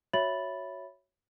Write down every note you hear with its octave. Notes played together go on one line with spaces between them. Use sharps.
F#4 C#5 E5 B5 A6 F#7